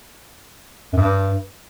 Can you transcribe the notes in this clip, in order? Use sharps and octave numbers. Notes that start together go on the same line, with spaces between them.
F#2
G2